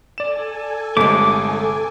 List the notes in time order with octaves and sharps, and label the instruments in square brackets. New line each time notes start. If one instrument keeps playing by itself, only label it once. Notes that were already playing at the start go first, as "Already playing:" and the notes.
[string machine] A4 G#5 [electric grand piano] D5 E7
[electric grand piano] G1 C3 [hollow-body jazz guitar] G#3 A3 [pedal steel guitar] D6